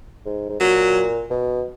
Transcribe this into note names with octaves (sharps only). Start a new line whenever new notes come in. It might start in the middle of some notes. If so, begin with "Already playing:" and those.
G#2
G#2
A#2 F#3
B2